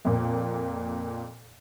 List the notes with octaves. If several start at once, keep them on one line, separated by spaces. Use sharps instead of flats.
F2 A#2 A#3